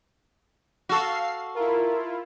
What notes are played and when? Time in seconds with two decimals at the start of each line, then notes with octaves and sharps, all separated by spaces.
0.89 F#4 A4 F5 C7
1.56 E4 F4 A#4